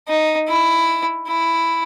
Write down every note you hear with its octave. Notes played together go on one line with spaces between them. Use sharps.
D#4
E4
E4